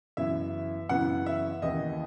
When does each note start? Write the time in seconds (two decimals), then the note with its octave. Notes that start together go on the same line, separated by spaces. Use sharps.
0.17 F#2 C#3 E3 B3 E4 E5
0.89 F#2 C#3 E3 B3 E4 F#5
1.26 E5
1.62 D#2 C#3 E3 B3 E4 D#5